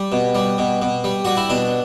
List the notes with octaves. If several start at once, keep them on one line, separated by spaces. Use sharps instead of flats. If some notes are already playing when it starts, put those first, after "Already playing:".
Already playing: G3
B2
G3
B2
B2
G3
G3 F#4
E4
B2 D4